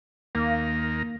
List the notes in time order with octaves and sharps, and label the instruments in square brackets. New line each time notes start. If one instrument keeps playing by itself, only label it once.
[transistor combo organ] D#2 A#4 [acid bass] A#3